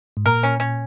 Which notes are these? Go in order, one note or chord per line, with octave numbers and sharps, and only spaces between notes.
G#2
A#2 A#4
C#4
C#4